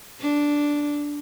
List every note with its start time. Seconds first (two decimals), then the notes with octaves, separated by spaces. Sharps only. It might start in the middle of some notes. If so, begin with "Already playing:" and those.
0.21 D4